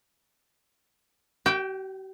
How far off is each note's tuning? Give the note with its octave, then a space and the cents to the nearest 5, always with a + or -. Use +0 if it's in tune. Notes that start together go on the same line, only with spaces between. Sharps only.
G4 -45 G5 +0